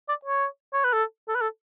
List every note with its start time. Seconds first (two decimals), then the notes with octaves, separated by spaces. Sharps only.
0.09 D5
0.25 C#5
0.73 C#5
0.84 B4
0.93 A4
1.28 A4
1.35 B4
1.41 A4